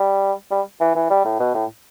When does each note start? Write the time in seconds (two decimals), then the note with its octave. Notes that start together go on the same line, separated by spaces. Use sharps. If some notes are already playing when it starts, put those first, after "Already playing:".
Already playing: G3
0.51 G3
0.81 E3
0.96 E3
1.10 G3
1.25 A2
1.40 B2
1.55 A2